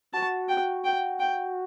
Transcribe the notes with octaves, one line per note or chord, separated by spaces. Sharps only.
F#4 A5
G5
G5
G5